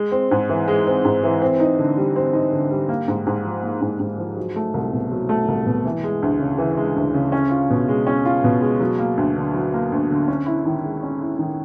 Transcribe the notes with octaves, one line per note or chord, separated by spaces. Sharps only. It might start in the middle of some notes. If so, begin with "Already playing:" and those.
Already playing: G#3
C4
G#2
E3
G#3
C4
G#2
E3
C4
D#4
D3
G3
C4
D#4
D3
G3
A#3
G#2
G#2
F3
A#3
G#2
G#2
F3
F#3
A3
C2
B2
F#3
A3
C2
B2
E3
G#3
D2
C#3
E3
G#3
D2
C#3
C#4
F4
B2
G#3
C#4
F4
B2
G#3
F#3
A#3
D2
D3
F#3
A#3
D2
D3
C#4
E4
D#3
G#3
C#4
E4
D#3